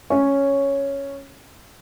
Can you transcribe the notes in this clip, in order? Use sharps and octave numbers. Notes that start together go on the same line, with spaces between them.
C#4 C#5